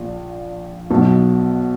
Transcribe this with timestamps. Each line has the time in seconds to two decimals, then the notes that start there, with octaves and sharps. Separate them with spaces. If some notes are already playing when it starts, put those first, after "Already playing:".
Already playing: A#1 A#2
0.90 B1 B2